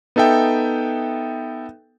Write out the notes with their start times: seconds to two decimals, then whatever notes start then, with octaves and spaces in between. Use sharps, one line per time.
0.16 B3 D#4 A4 E5 G5